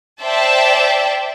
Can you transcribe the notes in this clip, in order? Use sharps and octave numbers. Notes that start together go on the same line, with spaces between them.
C5 D5 E5 G5 A5